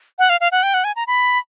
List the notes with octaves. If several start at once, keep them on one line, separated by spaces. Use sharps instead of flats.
F#5
F5
F5
F#5
G5
F#5
G#5
A#5
B5